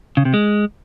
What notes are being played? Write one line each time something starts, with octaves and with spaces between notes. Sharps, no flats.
C#3
C3
G#3